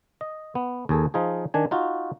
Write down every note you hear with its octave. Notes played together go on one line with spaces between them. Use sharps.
D#5
B3
D#2 G#4 A4
F3 D#4 F4 G#4
D#3 D4 G#5
D#4 F4 F#4